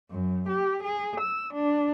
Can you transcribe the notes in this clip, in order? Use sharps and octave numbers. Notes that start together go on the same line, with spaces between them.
F#2
G4
G#4
E6
D4